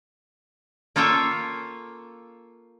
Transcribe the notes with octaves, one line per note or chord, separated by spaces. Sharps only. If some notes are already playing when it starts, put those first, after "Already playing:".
A#3 F4 A4 C#5 G5